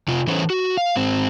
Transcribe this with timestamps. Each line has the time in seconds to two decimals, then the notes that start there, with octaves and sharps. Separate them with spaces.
0.08 C3 F4
0.27 E3 C#4 A4 C5 C#5
0.50 F#4
0.77 F5
0.96 G#2 C4